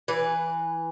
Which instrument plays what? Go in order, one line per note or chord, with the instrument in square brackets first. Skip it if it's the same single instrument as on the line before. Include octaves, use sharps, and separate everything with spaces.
[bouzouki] E3 B4